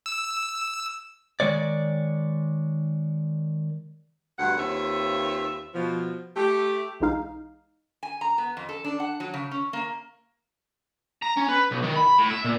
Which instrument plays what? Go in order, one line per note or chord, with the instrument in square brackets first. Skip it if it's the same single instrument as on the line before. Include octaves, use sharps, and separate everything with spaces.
[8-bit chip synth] E6
[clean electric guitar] D#3 G#3 C#5 D5
[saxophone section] D2 G2 B2 F#5
D#2 C4 F4 B4 C#5 E5
B2 F3
A3 G4
[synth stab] B1 E3 G#3 D#4 F5
[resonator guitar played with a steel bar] G#5
A#5
B3
F2
A4
D4
F#5
F#3
C#3
C#4
A#3
[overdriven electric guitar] A#5
C#4
B4
B1
D#3
B5
A2
E5
A#2